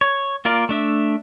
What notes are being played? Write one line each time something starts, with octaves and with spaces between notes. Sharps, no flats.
C#5
A#3 F4 A#4 D5
A3 D4 E5